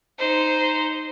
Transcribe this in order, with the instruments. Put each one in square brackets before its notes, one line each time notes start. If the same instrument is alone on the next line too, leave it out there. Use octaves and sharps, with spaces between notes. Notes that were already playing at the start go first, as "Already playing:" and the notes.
[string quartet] D#4 C5